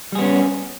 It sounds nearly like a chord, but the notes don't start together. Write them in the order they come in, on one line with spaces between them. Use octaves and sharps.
G3 G#4 B3 C#4